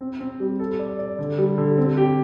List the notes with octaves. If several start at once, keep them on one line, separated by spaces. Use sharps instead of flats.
C4
C4
G3
A4
D5
D5
D3
G3
D3
C4
G4